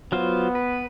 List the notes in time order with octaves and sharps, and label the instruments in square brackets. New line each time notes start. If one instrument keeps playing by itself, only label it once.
[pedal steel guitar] F#3 F4 C5 [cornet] B3
[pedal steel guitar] B4